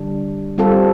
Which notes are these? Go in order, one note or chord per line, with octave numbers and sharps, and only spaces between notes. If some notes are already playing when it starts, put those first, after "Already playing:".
Already playing: D3 G3 D4
G3 C4 F4 A4